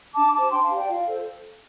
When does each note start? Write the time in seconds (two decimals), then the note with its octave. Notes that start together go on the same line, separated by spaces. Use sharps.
0.15 D4 A5 D6
0.33 G4 C5 A5 D6
0.51 D4 G5 C6
0.63 F5 A5
0.70 G4 C5
0.76 D5 G5
0.87 F4 F5
1.06 A4 C5